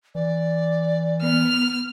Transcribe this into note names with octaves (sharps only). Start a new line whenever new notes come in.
E3 D5
B3 F6